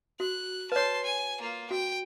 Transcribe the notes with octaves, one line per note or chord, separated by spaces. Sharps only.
F#4 F#6
B4 C#5 A5 C6
G#5
A#3 F4
F#4 G5